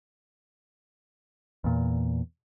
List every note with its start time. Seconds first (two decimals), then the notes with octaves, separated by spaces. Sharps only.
1.64 E2 A#2